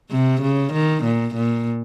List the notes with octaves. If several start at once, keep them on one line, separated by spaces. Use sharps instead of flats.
C3
C#3
D#3
A#2
A#2